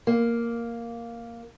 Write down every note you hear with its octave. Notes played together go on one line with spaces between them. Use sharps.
A#3